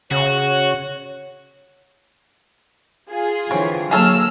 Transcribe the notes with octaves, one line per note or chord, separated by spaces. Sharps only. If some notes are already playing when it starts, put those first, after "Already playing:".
C#3 F#4 C#5
F4 G#4
D3 E3 C4 C#5
F#3 A#3 G#4 A4 C#5 E6 F6